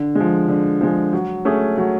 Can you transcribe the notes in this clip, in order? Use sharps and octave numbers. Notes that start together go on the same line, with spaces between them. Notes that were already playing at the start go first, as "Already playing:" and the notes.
Already playing: D3
F3 G#3
D3
F3 G#3
F#3
A3 C#4 G#4
F#3